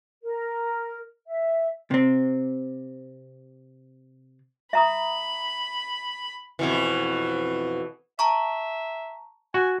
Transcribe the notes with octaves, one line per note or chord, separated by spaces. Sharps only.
A#4
E5
C3 C4
E5 A#5 B5 D#6
F2 B2 E3
E5 A5 A#5 C#6
F#4 G#5